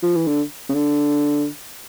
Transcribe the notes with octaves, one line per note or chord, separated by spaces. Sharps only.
F3
E3
D3
C#3
D3